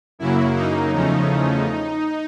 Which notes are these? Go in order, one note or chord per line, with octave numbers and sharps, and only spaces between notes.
F#2 C#3 F#3 A#3 E4
D#4
E2 C#3 F3 A3 C#4